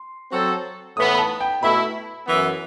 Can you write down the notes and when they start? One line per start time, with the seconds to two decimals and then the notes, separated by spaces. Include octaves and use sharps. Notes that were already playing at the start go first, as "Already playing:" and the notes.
Already playing: C6
0.32 F#3 C4 F#4 A4
0.97 A2 E3 B3 D#6
1.15 B5
1.19 A5
1.40 G5
1.62 B2 A3 E4 A4 B5
2.27 F#2 E3 B3